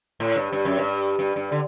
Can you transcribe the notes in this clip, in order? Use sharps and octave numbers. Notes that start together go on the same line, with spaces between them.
A2
G2
G2
F#2
G2
G2
G2
D3